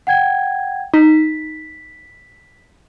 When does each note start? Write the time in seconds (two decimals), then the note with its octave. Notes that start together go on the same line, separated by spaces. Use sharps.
0.07 F#5 G5 G#6
0.94 D#4 B6